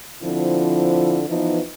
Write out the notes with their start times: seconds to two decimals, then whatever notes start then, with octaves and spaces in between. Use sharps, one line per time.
0.23 D3 F3 C4 E4
1.28 E3 F3 B3 D#4